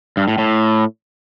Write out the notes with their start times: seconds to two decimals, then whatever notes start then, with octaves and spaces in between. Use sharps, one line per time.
0.17 G2
0.28 A2
0.38 A2